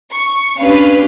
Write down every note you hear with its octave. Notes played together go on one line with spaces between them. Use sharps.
C#6
C#4 D4 G4 B4 F5